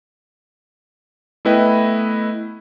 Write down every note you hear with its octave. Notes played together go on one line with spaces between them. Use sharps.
A3 B3 E4 B4 D#5 G5